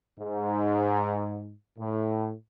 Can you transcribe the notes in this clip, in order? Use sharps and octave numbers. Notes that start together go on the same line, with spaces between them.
G#2
A2